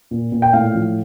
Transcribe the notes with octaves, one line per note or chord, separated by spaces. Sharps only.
A#2
A#2
G5
A2 F5
F3